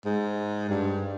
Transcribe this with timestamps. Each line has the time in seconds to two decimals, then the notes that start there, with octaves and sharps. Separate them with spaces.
0.05 G#2
0.69 G2